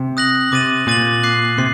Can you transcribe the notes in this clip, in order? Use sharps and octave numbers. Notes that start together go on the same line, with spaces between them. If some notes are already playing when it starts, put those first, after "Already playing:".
Already playing: C3
D#6 F#6 A#6 F#7
C3 D6 A6 D#7 F#7
A#2 D6 A6 D#7 F#7
D6 F#6 C7
C3 C7